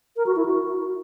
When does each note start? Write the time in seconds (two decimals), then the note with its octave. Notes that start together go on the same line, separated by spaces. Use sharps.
0.17 A#4
0.26 F#4
0.36 E4
0.46 F#4